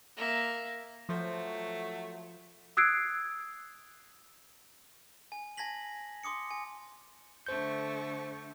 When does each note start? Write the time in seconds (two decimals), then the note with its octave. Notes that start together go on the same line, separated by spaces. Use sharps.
0.16 A#3 E5
1.09 F3 F#3 A3 C5
2.77 D#6 E6 F#6 G#6 C7 D7
5.32 G#5
5.57 G#5 A5 G#6 A#6 B6 F#7
6.23 C6 D6 D#6 C#7
6.51 G#5
7.47 D3 A3 C5 C#6 G6